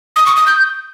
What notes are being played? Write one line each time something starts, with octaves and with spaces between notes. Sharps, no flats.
D#6
C#6
D#6
G6